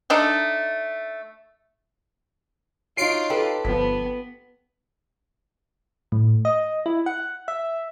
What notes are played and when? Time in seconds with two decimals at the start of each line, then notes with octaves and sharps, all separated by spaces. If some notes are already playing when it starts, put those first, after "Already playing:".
0.10 A3 D4 D#4
2.97 D#4 F4 F#4 C#5 C7 D7
3.30 G4 A4 B4
3.65 G1 F3 B3 B6
6.12 A2
6.45 D#5
6.86 E4
7.06 F#5
7.48 E5